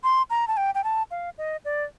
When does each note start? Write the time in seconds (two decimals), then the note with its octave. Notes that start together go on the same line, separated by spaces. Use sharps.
0.03 C6
0.30 A#5
0.48 A5
0.57 G5
0.74 G5
0.84 A5
1.11 F5
1.38 D#5
1.65 D5